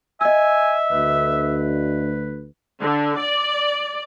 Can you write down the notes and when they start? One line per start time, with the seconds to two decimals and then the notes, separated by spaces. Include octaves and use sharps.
0.21 D#5 E5 G#5 E6
0.91 D2 B4
2.80 D3
3.17 D5